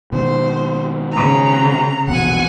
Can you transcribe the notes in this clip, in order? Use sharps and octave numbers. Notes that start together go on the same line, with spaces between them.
B2 D#3 G#3 C5
C#3 A#5
A#1 E2 B2 F#5 G#5